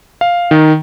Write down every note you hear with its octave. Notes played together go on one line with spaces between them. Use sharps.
F5
D#3